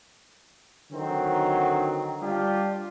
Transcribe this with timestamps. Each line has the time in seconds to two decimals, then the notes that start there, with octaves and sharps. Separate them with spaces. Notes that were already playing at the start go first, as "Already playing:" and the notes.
0.92 D3 D#3 F#3 C4
2.21 G3 D4 F4 G4